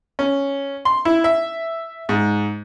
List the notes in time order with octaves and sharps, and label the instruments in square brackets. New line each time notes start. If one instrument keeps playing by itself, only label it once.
[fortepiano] C#4
C6
E4
E5
G#2